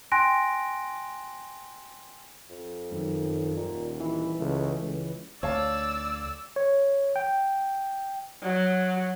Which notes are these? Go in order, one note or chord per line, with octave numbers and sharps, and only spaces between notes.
G5 G#5 C6 F#6 A#6 D7
F2
F#2 D#3
D#1 A#2
E3 E4
C#2 A3
C#2
D2 C#5 D5 F5 A5 E6
C#5
G5
F#3